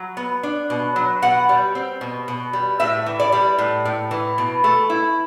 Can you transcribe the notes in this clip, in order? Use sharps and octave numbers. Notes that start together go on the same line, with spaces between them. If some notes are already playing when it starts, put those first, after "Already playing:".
Already playing: F#3
B3
D4
B2
F#3
B2 F#5
G3
C4
B2
B2
G3
A2 E5
E3
D5
G3
A2
A2
E3
B2
A3
E4